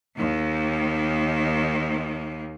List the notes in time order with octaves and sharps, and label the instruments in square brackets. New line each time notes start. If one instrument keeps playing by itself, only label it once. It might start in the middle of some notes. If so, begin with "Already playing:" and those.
[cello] D#2 D#3